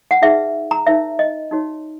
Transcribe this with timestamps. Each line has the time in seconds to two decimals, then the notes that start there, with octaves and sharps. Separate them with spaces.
0.11 F#5
0.22 D#4 G#4 B4 E5
0.71 A#5
0.86 D#4 A#4 C#5 E5
1.19 D#5
1.51 D#4 F#4 C#5